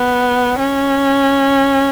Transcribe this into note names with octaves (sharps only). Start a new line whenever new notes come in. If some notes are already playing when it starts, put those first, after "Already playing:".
Already playing: B3
C#4